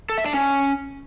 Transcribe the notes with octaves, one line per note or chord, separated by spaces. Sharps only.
A4
E5
D4
C#4